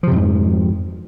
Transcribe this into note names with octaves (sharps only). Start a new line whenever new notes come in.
F2 G#2 C3 F3